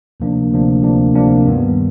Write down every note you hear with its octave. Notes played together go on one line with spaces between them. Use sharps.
D2 C3 F3 A#3 D4
D2 C3 F3 A#3 D4
D2 C3 F3 A#3 D4
D2 C3 F3 A#3 D4
G2 D#3 G3 B3